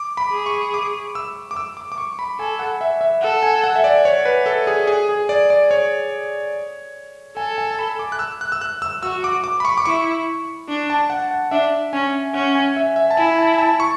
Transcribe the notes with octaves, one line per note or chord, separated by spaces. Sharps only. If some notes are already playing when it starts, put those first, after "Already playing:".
Already playing: D6
B5
G#4
C#6
D6
E6
D6
E6
D6
D6
C#6
B5
A4 G#5
F#5
E5
E5
A4 F#5
G#5
F#5
E5
D5
C#5
B4
A4
G#4
G#4
G#4
D5
D5
C#5
A4 G#5
G#5
A5
B5
D6
F#6
E6
F#6
E6
F#6
E6
F#4 E6
D6
D6
B5
C#6
D6
E4 C#6
D4
A5
F#5
F#5
D4 E5
C#4 G#5
C#4 F#5
G#5
E5
E5
A5
E4 G#5
A5
A5
C#6